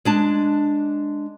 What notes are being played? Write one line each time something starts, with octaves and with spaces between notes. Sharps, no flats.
G#3 D4 A5